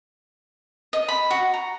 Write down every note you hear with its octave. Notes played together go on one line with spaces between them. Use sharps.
D#5
B5
F#4
A#5